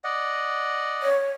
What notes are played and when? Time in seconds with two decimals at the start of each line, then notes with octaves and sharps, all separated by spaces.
0.04 D5 D#5 F#5
1.02 C#5